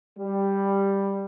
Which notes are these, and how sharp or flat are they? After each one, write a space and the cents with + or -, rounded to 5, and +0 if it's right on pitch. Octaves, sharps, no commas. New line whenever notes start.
G3 +5